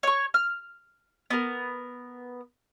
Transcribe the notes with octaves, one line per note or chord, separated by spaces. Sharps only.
C#5 C#6
F6
B3 A#4